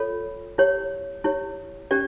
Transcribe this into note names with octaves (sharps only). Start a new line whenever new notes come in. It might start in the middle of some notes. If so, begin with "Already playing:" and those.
Already playing: F4 A4 C#5
E4 G4 C#5
E4 G4 C#5
C#4 G4 D5